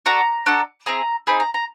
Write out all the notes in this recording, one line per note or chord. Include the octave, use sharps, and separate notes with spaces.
D4 F#4 A4 A#5
D4 F#4 A4
C4 E4 G#4 A#5
C4 D#4 G#4 B5
A#5
A#5